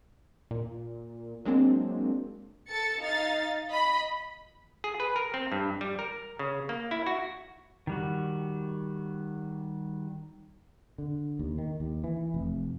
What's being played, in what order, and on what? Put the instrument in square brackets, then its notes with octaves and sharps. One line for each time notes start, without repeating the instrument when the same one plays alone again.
[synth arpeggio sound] A#2
F#3 G#3 A#3 C4 D4
[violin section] A4 A6 C#7
D#4 F5 A6
D#5 B5
[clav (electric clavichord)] G#4
B4
A#4
C4
G2
G3
A#4
C#3
A#3
E4
F#4
[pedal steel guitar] D#3 G3 F#4
[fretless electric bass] D3
D#2
D#3
D#2
E3
F1